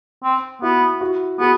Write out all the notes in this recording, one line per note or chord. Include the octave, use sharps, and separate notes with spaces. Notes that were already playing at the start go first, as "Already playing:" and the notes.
C4
B3 E4 F#4
E4 F#4
B3 F#4 G#4